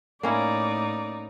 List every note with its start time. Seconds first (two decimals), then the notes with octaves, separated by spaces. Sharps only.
0.23 A2 A#3 C#4 D#4 E4 D5